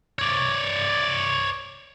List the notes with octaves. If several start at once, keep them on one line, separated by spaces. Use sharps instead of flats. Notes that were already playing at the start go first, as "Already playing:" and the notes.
C#5 D5